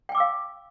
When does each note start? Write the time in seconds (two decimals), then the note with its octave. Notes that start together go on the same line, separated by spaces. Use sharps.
0.09 G5
0.12 G#5
0.15 D6
0.17 E6
0.20 F5